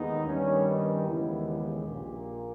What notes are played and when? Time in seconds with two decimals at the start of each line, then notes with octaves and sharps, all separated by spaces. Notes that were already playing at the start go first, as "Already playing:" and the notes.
Already playing: D#2 G#3 B3 D#4
0.26 G2 D#3 G3 B3 C#4
0.66 D#4
1.05 D#2 C#3 E3 G#3 B3 E4
1.46 G4
1.86 A#1 A#2 A#3